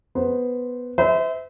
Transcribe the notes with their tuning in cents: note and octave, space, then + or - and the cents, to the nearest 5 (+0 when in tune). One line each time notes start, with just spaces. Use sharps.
B3 +0 C5 +0
C5 -40 E5 -25